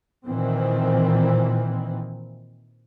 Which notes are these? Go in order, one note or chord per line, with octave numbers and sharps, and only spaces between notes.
A#2 D#3 E3 C4